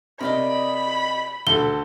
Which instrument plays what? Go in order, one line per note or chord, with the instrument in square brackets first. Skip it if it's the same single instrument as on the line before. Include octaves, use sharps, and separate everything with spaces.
[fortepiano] C3 [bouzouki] A#4 D5 D#5 [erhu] B5
[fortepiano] D2 A4 [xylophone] G7